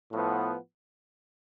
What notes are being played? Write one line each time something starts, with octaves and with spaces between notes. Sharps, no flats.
A2 F3 B3